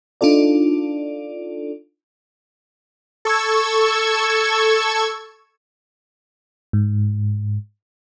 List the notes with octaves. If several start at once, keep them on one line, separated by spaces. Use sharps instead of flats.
D4 D#4 F4 A4 D5
A4 C#6 E6 G#6
G#2